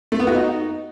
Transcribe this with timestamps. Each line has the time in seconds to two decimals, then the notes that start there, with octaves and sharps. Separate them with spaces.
0.12 A3
0.19 B3
0.27 F#4
0.35 D#4